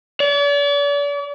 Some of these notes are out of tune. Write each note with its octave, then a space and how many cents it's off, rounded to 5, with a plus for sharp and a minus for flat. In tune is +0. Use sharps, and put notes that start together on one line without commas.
D5 -45